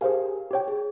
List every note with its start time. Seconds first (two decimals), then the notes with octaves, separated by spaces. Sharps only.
0.01 G4 G#4 A#4 C5 F5 G#5
0.51 G4 C#5 G5
0.68 G#4